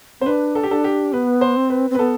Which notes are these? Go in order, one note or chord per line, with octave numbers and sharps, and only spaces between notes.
C4 C5
D4 B4
A4
G4
D4 A4
G4
B3 B4
C5
C4
B4
C4
B4
B3 A4